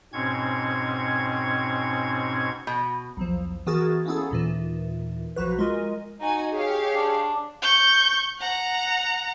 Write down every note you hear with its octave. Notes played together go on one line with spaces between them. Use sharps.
G#2 B2 C4 C#4 C#6 G#6
B2
B1 E2 F3
E3 B3 F#4 G#4 A#4 A6
A#3 B3 C#4 E4 G#4 A4
D#2 A#2 E3
B1 F3 F#4 B4
G#3 F4 A#4 D#5
D#4 F#4 G#5
G4 G#4 C#5 F5
D4
C#6 G6
F#5 A#5